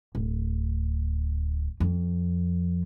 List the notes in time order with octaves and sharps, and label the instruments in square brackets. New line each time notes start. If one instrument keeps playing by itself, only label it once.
[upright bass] D1
F2